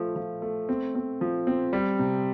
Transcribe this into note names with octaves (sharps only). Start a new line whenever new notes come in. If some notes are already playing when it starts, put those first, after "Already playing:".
Already playing: F3 A3
F3
A3
C4
C4
F3
C4
G3
C3